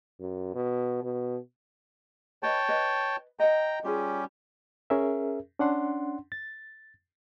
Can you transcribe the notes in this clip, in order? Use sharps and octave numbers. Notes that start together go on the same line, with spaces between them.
F#2
B2
B2
B4 C#5 D#5 G5 A5 B5
B4 D#5
D#5 F#5 G5 A#5
G3 C#4 F4 G4 G#4
C#4 G#4 A#4 E5
C#4 D4 F#5 C6
A6